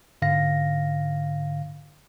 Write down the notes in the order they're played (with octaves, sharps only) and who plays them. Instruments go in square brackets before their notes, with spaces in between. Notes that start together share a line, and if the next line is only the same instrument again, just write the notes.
[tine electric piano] G#2 D3 F5 A#6